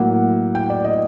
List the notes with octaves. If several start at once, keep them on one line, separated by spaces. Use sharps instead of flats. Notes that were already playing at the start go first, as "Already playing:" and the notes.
Already playing: A2 F#3 A#3 F#5
G5
D5
D#5